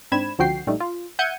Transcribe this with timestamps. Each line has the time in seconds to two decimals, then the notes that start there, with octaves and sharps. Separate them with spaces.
0.12 G#2 C4 D4 B5 G#6 E7
0.39 C#2 D3 F3 F#4 G5 C7
0.67 A#1 G3 A3 D#4
0.80 F4
1.19 E5 F#5 G6 G#6 C#7 D#7